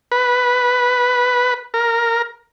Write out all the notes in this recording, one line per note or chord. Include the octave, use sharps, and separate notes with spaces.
B4
A#4